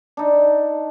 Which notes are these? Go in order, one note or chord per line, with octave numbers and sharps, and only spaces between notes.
D4 D#4